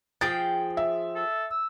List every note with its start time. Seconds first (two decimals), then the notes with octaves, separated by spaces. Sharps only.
0.21 F3 G#4 G5 A6
0.77 E5
1.15 A4
1.50 E6